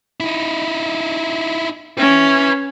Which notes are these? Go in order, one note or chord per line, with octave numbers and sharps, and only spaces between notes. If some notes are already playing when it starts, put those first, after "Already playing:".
D#4 E4
C#4 B4 E5